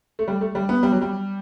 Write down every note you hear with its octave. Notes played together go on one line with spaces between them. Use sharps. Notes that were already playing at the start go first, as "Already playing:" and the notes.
A3
G3
A3
G3
B3
G3
F#3
G3